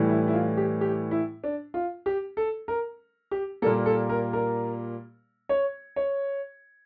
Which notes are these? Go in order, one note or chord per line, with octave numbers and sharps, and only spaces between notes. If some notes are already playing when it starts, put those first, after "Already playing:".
Already playing: A2 E3 G3
E4
E4
F4
G4
G4
E4
D4
F4
G4
A4
A#4
G4
A#2 G3 A#3 A4
A4
A#4
A#4
C#5
C#5